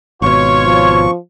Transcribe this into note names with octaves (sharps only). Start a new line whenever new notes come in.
G#1 B2 F4 C#5 C#6
F3